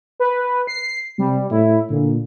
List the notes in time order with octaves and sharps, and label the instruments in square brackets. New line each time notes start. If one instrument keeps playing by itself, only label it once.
[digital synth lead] B4
C7
[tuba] C3 [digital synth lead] G3
[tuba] A2 [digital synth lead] E4
[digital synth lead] A#2 [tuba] D3